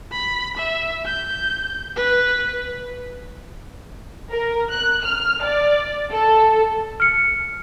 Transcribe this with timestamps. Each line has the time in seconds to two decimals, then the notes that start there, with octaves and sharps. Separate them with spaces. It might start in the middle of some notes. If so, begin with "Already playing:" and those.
0.12 B5
0.57 E5
1.06 G6
1.96 B4
4.32 A#4
4.71 F#6
5.04 F6
5.44 D5
6.11 A4
7.00 F6 C#7